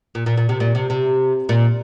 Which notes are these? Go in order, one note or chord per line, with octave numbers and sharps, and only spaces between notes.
A#2
A#2
A#2
C3
A#2
C3
C3
A#2